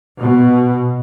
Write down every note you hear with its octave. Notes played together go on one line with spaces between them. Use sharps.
B2